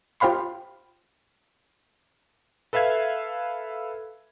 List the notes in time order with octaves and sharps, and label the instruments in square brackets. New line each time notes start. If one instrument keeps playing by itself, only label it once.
[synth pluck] F4 G4 C5 F5 B5 C6
[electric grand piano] A4 B4 E5 F5 G#6